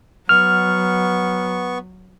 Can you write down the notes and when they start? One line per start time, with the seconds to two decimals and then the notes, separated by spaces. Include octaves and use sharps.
0.29 F#3 B3 C#6 F6